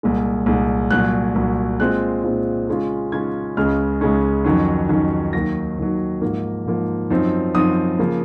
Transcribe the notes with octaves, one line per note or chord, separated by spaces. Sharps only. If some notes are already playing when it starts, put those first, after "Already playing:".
C2 A#2 G#3
C2 A#2 G#3
C2 A#2 F#3 F#6
C2 A#2 F#3
A#2 G#3 C4 F4 F#6
A#2 G#3 C4 F4
C#3 G#3 C#4 F4
C#3 G#3 C#4 F4 G#6
C#2 C#3 G#3 C#4 F6
C#2 C#3 G#3 C#4
F2 D#3 F#3 C#4
F2 D#3 F#3 C#4
D#2 D#3 F#3 A#6
D#2 D#3 F#3
G#2 F3 A#3
G#2 F3 A#3
F#2 F3 C4 D#4
F#2 F3 C4 D#4 D#6
C#3 F3 A#3